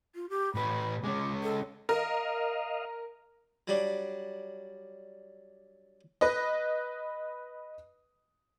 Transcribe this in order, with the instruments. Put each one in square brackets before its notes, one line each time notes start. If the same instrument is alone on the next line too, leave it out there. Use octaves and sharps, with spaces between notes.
[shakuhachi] F4
G4
[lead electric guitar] A2 B4 [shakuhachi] B5
[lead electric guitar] G#3 C#4 [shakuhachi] D6
[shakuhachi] A4
[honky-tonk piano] A#4 [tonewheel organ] D#5 F5
[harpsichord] F#3 G3 D4
[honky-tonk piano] B4 D#5